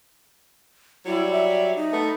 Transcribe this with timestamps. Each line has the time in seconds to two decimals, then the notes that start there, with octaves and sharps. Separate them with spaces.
1.06 F#3 G3 E4 D5
1.32 E5
1.76 D#4
1.93 A3 B3